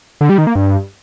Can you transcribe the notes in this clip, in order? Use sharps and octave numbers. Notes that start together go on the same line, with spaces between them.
D3
G3
D#3
A#3
G2